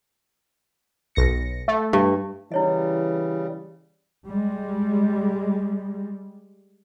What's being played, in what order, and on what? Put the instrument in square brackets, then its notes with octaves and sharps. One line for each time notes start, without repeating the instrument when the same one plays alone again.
[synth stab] B1 A#6 C#7
A3
[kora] G2
[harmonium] C#3 G3 [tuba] E3 [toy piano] E4 C#5 D#5
[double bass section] G3 G#3